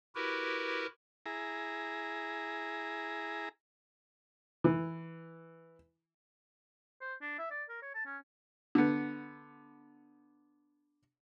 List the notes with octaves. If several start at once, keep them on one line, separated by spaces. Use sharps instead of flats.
E4 F#4 G4 A#4 B4
E4 G#4 A#5
E3
C5
D4
E5
D5
A#4
C#5
A5
C#4
D3 B3